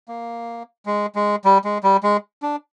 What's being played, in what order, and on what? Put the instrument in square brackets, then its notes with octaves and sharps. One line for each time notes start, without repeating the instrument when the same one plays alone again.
[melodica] A#3
G#3
G#3
G3
G#3
G3
G#3
D4